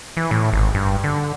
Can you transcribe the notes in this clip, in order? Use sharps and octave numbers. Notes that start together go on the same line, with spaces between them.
E3
A2
G#1
G2
D3